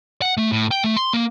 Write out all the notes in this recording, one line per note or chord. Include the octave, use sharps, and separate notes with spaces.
F#5
A3
A2
G5
A3
C6
A#3